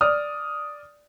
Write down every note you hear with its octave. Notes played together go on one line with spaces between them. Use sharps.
D5 D#6 F6